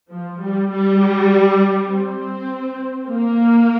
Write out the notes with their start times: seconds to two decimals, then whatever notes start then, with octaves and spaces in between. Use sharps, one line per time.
0.11 F3
0.41 G3
0.71 G3
1.90 C4
3.09 A#3